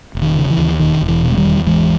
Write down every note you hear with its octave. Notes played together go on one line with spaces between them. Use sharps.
E1
D#3
C#3
E3
D#2
E1 D#3
E1
E3
B2
G#3
D#3 G3
E2
G#1 E3 G#3